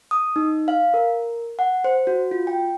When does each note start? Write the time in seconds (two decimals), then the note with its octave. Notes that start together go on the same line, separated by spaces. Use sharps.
0.11 D#6
0.36 D#4
0.68 F5
0.94 A#4
1.59 F#5
1.84 C5
2.07 F#4
2.31 F4
2.47 G5